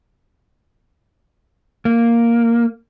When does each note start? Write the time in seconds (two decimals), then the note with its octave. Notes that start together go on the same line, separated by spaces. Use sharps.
1.85 A#3